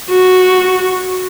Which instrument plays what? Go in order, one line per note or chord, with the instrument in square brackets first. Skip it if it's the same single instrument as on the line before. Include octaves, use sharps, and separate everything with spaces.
[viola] F#4